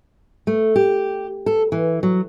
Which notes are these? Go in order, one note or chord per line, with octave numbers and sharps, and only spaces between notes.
A3
G4
A4
E3
F#3